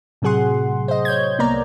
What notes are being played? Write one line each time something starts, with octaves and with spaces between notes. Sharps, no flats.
A2 C3 F#3 G#4 F#5 C6
C5 D#5
C#5 G6 G#6
C2 A#3 B3 A#4 D5 A#5